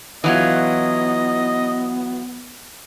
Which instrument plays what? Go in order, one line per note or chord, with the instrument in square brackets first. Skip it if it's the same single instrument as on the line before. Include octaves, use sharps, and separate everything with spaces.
[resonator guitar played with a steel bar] E3 F#3 F4 [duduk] B3 [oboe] D#5